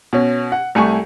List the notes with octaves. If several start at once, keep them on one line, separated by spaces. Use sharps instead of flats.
B2 C#4
F#5
C2 A3 G#5 C#6